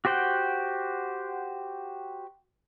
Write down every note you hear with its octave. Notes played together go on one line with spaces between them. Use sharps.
F#4 G4 C5 F#5 G5